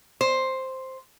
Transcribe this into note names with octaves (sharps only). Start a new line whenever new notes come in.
C5